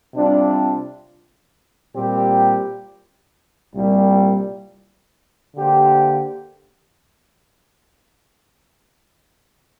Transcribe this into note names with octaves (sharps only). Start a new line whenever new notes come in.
C3 G3 D4 F4
A#2 G3 C4 G4
C2 A#2 G3
D3 A#3 G4 C5